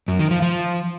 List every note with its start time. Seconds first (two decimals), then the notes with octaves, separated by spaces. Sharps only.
0.08 F#2
0.19 D#3
0.31 F3
0.42 F3